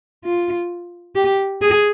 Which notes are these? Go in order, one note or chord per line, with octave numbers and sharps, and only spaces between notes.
F4
G4
G#4